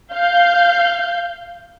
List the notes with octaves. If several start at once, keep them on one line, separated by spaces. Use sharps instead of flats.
F5 G6